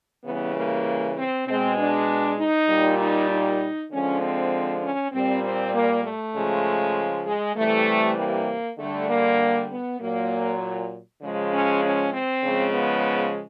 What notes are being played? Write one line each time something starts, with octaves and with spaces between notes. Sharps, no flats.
C#3 E3 G3 B3
A#3
C4
B2 G#3 C4
D4
D#4
A#2 G3
D#4
D#4
D3 F3 G#3 C#4
C4
C#4
A#2 G3 C4
C4
A#3
A3
C#3 F3 G#3
G#3
C3 E3 G3 A3
A#3
D3 G3 A3
A#3
B3
A#2 F#3 A#3
C#3 F3 G#3
C#4
C#4
C4
C#3 F3 G#3
B3